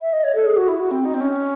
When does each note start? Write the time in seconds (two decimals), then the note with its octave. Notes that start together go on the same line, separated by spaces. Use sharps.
0.01 E5
0.12 D#5
0.23 C#5
0.35 A4
0.45 G#4
0.56 F#4
0.68 E4
0.79 F#4
0.90 C4
1.05 D#4
1.14 C4
1.20 C#4